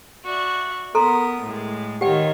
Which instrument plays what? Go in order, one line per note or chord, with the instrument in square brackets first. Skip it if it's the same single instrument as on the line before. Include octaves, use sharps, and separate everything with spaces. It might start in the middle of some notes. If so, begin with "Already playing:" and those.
[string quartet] F#4 D5 E5
[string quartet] B3 A#4 D#6 [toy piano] A4 A#5 C6
[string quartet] A2 G#3
[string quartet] D#3 F4 C#5 [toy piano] G4 F#5 G5